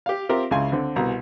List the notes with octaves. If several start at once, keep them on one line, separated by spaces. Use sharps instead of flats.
G4 F5
C4 F4 G4 A#4 E5
C#2 C#3 E4 G#5 C6
D3 C4
C2 B2 A#5